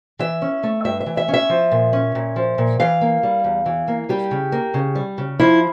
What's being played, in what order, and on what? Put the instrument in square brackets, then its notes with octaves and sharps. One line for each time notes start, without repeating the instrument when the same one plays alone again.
[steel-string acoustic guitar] E3 E5
C#4
A3
G2 E5
E5
E3
E5
C#4
E5
F3
A#2
C#4
A#2
F3
A#2
E3 F5
A#3
G3
E2
E3
A#3
G3 G4
C#3
A#3
C#3
G3
C#3
F3 E4